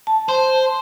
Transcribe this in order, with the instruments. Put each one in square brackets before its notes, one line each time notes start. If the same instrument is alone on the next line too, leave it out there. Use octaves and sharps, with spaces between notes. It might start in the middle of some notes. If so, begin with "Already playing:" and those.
[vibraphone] A5
[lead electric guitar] C5